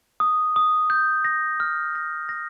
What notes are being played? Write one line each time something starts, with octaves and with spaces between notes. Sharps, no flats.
D#6
D#6
G6
A#6
F6
A#6
A#6